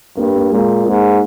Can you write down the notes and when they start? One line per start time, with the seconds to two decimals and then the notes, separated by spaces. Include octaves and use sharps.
0.17 G2 A#3
0.35 A#3
0.51 A#2 G#3
0.87 G#2 A#3